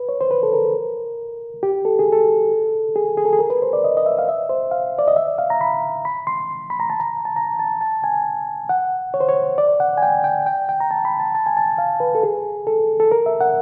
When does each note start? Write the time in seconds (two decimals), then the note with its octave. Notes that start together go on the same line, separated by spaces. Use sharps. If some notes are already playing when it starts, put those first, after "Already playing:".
Already playing: B4
0.09 C#5
0.21 C5
0.31 B4
0.43 A4
0.53 A#4
1.63 G4
1.85 A4
1.99 G#4
2.12 A4
2.96 G#4
3.17 G#4
3.25 A4
3.33 G#4
3.39 A#4
3.50 B4
3.62 C5
3.73 D5
3.84 D#5
3.97 D#5
4.06 E5
4.19 F5
4.29 E5
4.49 C5
4.71 F5
4.99 D5
5.08 D#5
5.16 E5
5.38 F5
5.50 A#5
5.61 B5
6.05 B5
6.27 C6
6.70 B5
6.80 A#5
6.90 A5
7.00 A#5
7.25 A5
7.36 A#5
7.59 A5
7.81 A5
8.04 G#5
8.69 F#5
9.14 C#5
9.21 C5
9.29 C#5
9.58 D5
9.80 F#5
9.98 G#5
10.02 G5
10.24 G5
10.46 G5
10.69 G5
10.80 A#5
10.91 A5
11.05 B5
11.20 A5
11.35 A5
11.46 G#5
11.57 A5
11.78 F5
12.00 B4
12.15 A4
12.23 G#4
12.67 A4
13.00 A4
13.12 A#4
13.26 E5
13.41 F#5